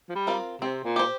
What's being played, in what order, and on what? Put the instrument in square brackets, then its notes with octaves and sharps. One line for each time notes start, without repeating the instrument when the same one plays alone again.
[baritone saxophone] F3
G3
[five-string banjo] C4 F4 A#4
[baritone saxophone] C3 [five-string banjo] C4
[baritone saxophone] A#2
[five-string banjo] G4 C5